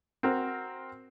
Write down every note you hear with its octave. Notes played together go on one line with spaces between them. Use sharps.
C4 F#4 A#4